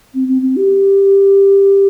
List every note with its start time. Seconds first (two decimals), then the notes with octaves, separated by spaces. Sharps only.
0.14 C4
0.28 C4
0.42 C4
0.56 G4